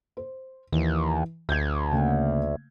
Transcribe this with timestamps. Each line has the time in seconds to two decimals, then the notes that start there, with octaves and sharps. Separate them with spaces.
0.17 C5
0.72 D#2 E3
1.49 D2 G6 G#6
1.92 C#3 A3 A#3